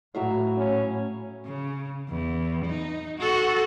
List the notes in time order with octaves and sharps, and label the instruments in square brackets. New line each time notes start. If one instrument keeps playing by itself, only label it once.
[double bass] A2 [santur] F#3 E5 F5
[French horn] C#4
[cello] C#3
E2
D#4
F#4 A4